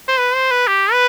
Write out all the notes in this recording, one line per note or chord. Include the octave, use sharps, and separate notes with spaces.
C5
B4
C5
B4
G4
B4